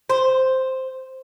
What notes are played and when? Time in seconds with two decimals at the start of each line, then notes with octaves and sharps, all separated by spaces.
0.09 C5